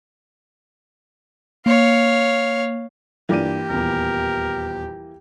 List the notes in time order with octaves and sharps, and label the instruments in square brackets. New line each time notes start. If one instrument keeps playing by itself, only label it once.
[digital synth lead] A#3 [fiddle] C#5 F5
[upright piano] G2 D5 D#7 [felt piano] E3 A#3 F4 [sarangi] G4
[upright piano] D#1 E2 [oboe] A#4